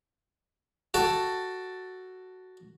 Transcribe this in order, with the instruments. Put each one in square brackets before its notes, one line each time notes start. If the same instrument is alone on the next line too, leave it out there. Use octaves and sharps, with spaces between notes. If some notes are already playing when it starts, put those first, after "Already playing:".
[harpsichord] F#4 A4 G5 A5